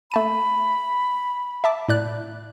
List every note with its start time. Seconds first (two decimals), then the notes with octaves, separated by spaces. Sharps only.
0.12 A3 A5 B5 D#7
1.64 E5 A5 D6
1.89 A2 D5 F#6